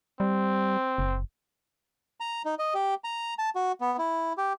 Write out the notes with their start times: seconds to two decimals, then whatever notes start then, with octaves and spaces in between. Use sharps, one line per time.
0.20 G3 C4
0.98 F#1
2.20 A#5
2.45 D#4
2.59 D#5
2.74 G4
3.04 A#5
3.39 A5
3.55 F#4
3.81 B3
3.98 E4
4.38 G4